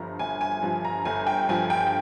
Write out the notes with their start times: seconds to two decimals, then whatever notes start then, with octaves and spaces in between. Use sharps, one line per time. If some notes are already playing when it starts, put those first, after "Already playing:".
Already playing: G1 G2 F3 A#5
0.19 G1 G#5
0.41 G#5
0.63 G2 F3
0.85 A#5
1.05 G1 G#5
1.27 G5
1.49 G2 F3 G#5
1.70 G5